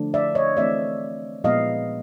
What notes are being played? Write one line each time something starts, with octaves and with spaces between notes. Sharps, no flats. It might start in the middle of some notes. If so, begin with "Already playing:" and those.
Already playing: D3 F3 A3 D4
D5 E5
C#5 D#5
E3 A3 C4 D5 E5
A#2 F3 G#3 B3 D#5 F5